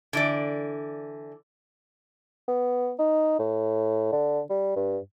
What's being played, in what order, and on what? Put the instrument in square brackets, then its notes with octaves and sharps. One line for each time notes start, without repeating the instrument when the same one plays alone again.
[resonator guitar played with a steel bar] D3 E3 D5
[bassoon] B3
D#4
A2
D3
G3
G2